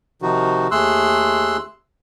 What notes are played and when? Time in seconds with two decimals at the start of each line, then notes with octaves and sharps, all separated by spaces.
0.22 C3 D#3 F3 D#4 F#4
0.71 D#2 A3 G#4 C6 E6 F#6